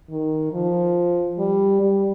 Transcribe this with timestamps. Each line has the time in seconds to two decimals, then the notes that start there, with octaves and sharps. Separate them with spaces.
0.10 D#3
0.53 F3
1.39 G3
1.82 G3